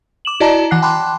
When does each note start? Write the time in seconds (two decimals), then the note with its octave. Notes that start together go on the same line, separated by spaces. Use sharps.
0.25 D6 E7 F#7
0.40 E4 F#4 D5 D#5 A5 A#5
0.71 E3 F#5 F#6 C7
0.82 G5 A5 B5 C6 D6 F#6